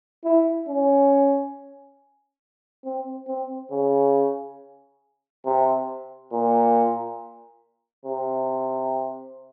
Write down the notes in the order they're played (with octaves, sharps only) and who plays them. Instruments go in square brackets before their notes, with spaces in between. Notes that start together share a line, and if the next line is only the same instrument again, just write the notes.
[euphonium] E4
C#4
C4
C4
C#3
C3
A#2
C3